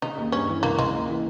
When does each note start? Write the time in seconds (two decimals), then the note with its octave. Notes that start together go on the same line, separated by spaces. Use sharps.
0.02 C#3 D#4
0.18 D#2
0.32 G2 C#4
0.48 E3
0.63 C#2 A#3
0.78 C#2 G#3
0.94 A#3
1.09 E3